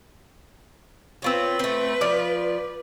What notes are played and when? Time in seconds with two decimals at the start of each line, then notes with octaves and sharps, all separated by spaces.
1.22 C4 F4 B4 C#5
1.59 A3 C4
2.01 F3 F4 D5